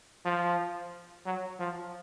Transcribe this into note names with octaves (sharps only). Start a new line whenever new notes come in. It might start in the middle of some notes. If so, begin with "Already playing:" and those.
F3
F#3
F3